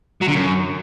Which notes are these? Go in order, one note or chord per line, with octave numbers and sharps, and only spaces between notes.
F#3
D3
F#2